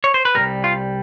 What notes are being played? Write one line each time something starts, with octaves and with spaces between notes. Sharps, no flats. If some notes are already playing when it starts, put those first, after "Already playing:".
C#5
C5
B4
A#2 G3 A#4
C2
F4